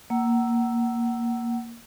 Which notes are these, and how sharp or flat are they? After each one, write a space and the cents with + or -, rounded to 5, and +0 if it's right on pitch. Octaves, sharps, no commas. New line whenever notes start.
A#3 +0 F#5 +30 E6 +0